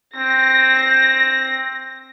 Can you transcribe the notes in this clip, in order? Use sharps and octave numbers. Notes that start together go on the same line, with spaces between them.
C4 A#6